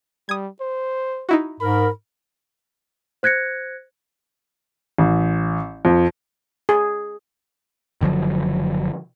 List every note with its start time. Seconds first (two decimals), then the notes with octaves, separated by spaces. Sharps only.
0.29 G3 D#6 G#6
0.61 C5
1.29 D#4 E4 F#4
1.60 G#2 A#4 B5
3.23 C5 F#6 G#6 A#6 C#7
4.98 A1
5.85 F2
6.69 G#4
8.01 F#1 D3 F3 F#3